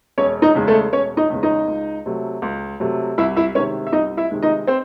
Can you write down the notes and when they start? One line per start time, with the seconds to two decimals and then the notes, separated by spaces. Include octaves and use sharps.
0.18 E1 C#4 C#5
0.42 D#4 D#5
0.55 E2 C#3 G#3
0.67 A3 A4
0.92 E1 C#4 C#5
1.17 D#4 D#5
1.30 E2 C#3 G#3
1.43 D#4 D#5
1.68 C#2
2.06 C3 F#3 A3
2.42 C#2
2.80 C3 F#3 A3
3.18 C2 E4 E5
3.37 E4 E5
3.55 C3 D#3 G#3 C#4 C#5
3.87 E5
3.93 C2 D#4 D#5
4.17 E4 E5
4.31 C3 D#3 G#3
4.43 D#4 D#5
4.67 C4 C5